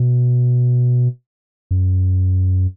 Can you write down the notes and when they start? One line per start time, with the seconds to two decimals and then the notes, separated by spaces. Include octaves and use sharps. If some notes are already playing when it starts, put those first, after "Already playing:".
Already playing: B2
1.71 F#2